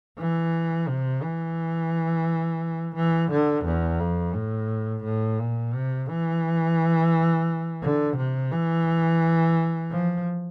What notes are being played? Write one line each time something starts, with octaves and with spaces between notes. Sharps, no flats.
E3
C3
E3
E3
D3
E2
F2
A2
A2
A#2
C3
E3
D3
C3
E3
F3